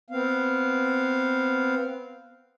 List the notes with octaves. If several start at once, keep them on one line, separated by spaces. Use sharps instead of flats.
B3 C4 F5